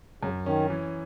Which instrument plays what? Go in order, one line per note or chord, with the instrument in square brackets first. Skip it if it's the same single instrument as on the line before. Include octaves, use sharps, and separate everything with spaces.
[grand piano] F#2 [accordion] C#3
[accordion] D#3 [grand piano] C#4
[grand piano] E3